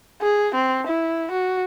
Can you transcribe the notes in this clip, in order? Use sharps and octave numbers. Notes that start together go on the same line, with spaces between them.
G#4
C4
E4
F#4